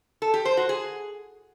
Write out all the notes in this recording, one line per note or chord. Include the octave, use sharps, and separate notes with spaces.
A4
G4
C5
F#4
G#4